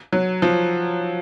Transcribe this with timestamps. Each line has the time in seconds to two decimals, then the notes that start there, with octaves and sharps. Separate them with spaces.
0.13 F#3
0.42 F3